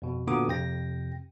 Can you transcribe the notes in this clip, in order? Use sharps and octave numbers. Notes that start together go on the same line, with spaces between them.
F2 B2
A#2 D3 B3 F#4 D6 D#6
F2 C3 G5 A#6